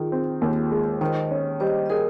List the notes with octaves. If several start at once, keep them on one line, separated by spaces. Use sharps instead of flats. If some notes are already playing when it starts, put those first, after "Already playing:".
Already playing: D#3 F4 G#4
C4
D#2
G#3
D#3 C5 D#5
C#4
G3 C5 D#5
D#5
G#4 A#4 C#5